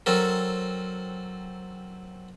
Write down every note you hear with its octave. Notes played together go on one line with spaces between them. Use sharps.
F#3 C4 A4 A#4